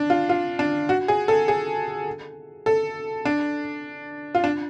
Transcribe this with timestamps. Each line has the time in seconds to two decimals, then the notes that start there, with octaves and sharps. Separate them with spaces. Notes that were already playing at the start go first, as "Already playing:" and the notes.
Already playing: D4
0.10 F4
0.29 F4
0.59 D4
0.89 F#4
1.08 G#4
1.28 A4
1.48 G#4
2.66 A4
3.25 D4
4.35 F4
4.44 D4